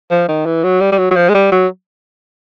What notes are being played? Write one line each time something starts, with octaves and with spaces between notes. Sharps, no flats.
F3
D#3
E3
F#3
G3
G3
F#3
F#3
F3
G#3
G3
F#3